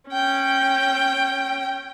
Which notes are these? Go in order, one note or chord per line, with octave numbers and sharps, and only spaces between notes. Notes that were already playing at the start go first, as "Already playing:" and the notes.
C#4 G5